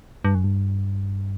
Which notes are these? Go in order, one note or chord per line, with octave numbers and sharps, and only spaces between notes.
G2
F#2
G2